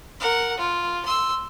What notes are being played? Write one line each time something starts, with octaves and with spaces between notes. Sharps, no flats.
A#4 F#5
F4
C6 E6